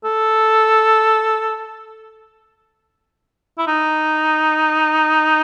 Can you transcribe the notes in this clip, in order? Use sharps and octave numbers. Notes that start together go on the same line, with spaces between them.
A4
E4
D#4